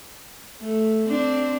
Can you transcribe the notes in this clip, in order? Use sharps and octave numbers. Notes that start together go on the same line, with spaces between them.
A3
C4 D4